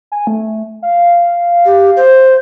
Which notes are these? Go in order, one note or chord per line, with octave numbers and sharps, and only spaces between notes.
G#5
A3
F5
G4
C5